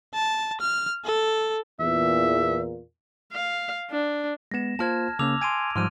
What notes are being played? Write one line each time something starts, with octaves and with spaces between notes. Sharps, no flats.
A5
F6
A4
E2 A#2 E5
F5
D4
G#3 B3 A#6 E7
A#3 F4 C5 A5 F6 G#6
C#3 A#3 C#4 D6 E6 F7
G#5 C6 G#6 D7 D#7
G#2 F3 G3 C6 F6 D#7